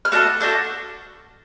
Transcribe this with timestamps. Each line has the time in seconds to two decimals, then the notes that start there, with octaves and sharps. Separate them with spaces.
0.05 F6
0.12 A3 D4 F#4 A4 F#6
0.40 A3 D4 F#4 A4 G6